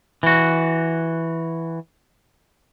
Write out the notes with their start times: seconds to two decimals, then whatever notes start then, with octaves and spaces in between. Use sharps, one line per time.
0.23 E3 F#4